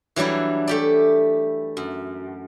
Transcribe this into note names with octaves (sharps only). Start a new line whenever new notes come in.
E3 F#3 G3 D4 E4
A3 G4 D5
F#2